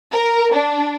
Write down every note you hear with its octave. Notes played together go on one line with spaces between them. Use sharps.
A#4
D4